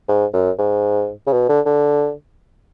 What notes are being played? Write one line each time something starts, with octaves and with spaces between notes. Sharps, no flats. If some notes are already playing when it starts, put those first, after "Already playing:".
G#2
F#2
G#2
C#3
B2
D3
D3